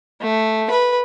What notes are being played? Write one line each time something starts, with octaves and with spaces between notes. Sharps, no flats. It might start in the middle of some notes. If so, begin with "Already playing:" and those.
A3
B4